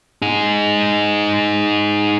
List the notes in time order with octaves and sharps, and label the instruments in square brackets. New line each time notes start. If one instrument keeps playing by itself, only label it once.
[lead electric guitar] D#4 G#4